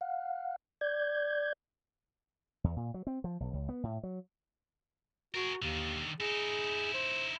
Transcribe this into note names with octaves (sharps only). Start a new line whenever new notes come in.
F5 F#5
D5 G6 G#6
E2
A#2
F#3
C4
F3
B1
C#2
B3
A2
F#3
F#4 G#4 A#4
D#2 D3 D#3
D#4 E4 G#4
C5